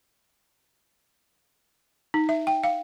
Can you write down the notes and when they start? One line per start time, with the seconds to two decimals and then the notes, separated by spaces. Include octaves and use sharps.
2.14 D#4
2.29 E5
2.47 G5
2.64 F5